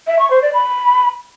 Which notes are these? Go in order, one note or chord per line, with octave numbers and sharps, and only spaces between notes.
E5
C#6
C5
D5
B5